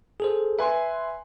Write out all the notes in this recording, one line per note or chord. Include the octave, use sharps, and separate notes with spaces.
G#4 A4 C5
B4 E5 G#5 C6